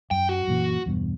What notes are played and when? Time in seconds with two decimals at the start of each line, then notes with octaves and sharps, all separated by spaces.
0.11 F#2 G5
0.29 F#4
0.47 F#2 A#2 E3
0.86 E2 G2 B2